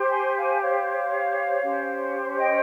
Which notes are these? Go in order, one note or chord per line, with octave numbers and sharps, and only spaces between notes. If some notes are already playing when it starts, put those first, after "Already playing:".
Already playing: G4 C5
G#5 C6
F5 G#5
C#5 F5
C#4 G4 C5
D#5 G5